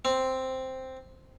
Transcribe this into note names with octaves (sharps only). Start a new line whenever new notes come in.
C4